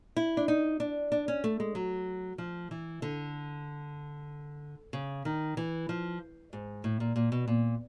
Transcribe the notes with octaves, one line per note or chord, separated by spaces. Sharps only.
E4
D4
D#4
D4
D4
C#4
A3
G#3
F#3
F3
E3
D3
C#3
D#3
E3
F3
G#2
A2
A#2
A#2
B2
A#2